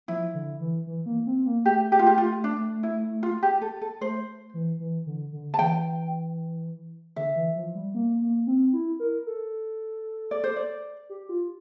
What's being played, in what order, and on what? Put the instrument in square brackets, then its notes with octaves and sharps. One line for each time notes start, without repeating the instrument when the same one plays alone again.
[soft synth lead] F3 [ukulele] E4
[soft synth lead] D3
E3
E3
A#3
C4
A#3
[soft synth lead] A3 [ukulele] G4
[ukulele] G4
F4
G4
F4
D4
E4
F4
G4
A4
A4
[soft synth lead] A3 [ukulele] C5
[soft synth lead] E3
E3
D3
D3
[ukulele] A5
[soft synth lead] E3 [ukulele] G5
[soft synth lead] D3 [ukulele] E5
[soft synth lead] E3
F3
G3
A#3
A#3
C4
E4
A#4
A4
[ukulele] D5
C5
D5
[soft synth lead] G4
F4